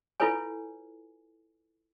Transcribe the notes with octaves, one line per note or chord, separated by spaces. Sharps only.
E4 F4 A4 B4 C#5 G#5